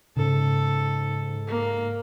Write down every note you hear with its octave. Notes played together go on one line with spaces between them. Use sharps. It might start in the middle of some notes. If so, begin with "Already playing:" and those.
G#2 C#3 A4
A#3